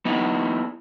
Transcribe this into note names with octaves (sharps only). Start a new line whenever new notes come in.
B3 D#4 E4